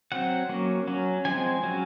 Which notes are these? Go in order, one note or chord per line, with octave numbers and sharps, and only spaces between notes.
F#3 C4 F#5
F#3 A#3 C#4
F#3 C#4
F3 G#3 C4 G#5
F#3 C#4